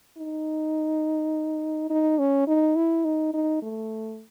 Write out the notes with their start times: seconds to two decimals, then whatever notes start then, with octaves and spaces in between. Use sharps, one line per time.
0.18 D#4
1.90 D#4
2.19 C#4
2.47 D#4
2.76 E4
3.05 D#4
3.34 D#4
3.62 A3